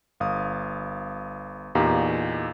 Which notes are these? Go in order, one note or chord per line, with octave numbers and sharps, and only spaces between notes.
G1 F5 D#6
E2 A#2 D#4 G4 F5 A#5